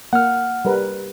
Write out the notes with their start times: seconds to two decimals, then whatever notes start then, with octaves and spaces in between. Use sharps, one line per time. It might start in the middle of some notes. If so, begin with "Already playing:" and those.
0.13 A#3 F#5 F6
0.65 G3 A#4 B4